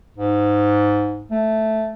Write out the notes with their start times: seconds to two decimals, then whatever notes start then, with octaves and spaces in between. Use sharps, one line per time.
0.17 G#2
1.31 A3